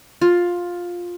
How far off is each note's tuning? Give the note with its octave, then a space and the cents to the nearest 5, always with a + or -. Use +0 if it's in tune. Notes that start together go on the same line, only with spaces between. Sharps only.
F4 +10